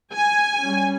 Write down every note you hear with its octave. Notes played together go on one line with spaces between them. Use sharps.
G#5
G3 C#4